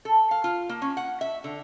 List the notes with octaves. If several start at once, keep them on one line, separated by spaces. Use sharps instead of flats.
A4
F5
F4
A#3
C#4
F#5
E5
D3